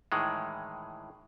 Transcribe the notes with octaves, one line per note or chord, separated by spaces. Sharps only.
A2 D#3 E3 G#3